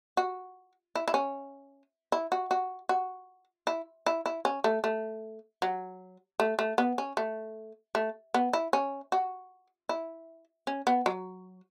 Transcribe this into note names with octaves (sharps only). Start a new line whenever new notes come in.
F#4
E4
E4
C#4
E4
F#4
F#4
F#4
E4
E4
E4
C#4
A3
A3
F#3
A3
A3
B3
C#4
A3
A3
B3
E4
C#4
F#4
E4
C#4
B3
F#3